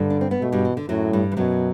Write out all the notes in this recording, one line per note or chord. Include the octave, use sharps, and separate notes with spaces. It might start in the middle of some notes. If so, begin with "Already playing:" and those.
Already playing: G2 D3 G3
D4
C4
B3
B2 A3
G2 G3
E3
D3
F#2 A2 F#3
G2 G3
E3
F#2 B2 F#3